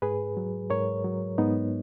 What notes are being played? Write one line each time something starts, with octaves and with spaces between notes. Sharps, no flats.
G#2 G#4 B4
F#3
G#2 A#4 C#5
F#3
G#2 B3 D#4